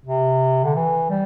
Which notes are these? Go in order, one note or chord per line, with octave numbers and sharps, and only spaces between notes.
C3
D3
E3
G3